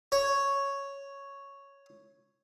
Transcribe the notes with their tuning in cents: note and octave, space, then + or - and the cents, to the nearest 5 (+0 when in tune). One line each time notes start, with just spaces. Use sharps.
C#5 +0